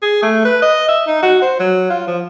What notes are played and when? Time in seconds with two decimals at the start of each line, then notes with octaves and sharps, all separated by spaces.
0.02 G#4
0.23 A3
0.45 B4
0.62 D#5
0.89 E5
1.07 D#4
1.23 F#4
1.42 C5
1.60 F#3
1.90 F4
2.08 F3